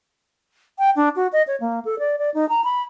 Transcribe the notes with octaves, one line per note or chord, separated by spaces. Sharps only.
G5
D4
F#4
D#5
C#5
A#3
A4
D5
D5
D#4
A#5
B5